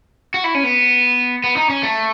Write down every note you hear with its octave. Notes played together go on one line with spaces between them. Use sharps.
F#4
E4
C#4
B3
B3
D#4
C#4
A3